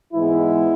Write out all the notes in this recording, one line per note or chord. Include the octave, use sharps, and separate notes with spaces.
G#2 E3 G#3 B3 E4